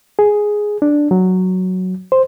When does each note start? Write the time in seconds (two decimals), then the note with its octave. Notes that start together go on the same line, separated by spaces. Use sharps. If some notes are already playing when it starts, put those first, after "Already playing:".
0.19 G#4
0.82 D4
1.11 F#3
2.12 C5